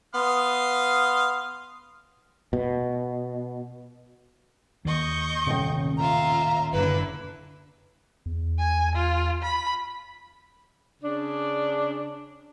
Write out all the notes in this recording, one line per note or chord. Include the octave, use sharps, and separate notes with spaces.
B3 F5 C6 D#6
B2
D#2 D#5 C#6 G6
D#1 A1 C3 G5
F4 E5 F5 A#5
F#1 D3 E4 B4
E2
G#5
F4
B5
C#3 D4